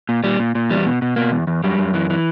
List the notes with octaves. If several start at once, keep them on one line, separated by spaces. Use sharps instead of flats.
A#2
A#2 G3
A#2
A#2
E2 G3
B2
B2
B2 A#3
E2
E2
F#2 G3
F#2
E3
E3